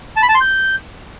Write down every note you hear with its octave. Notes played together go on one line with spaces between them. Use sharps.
A5
B5
A5
C6
G6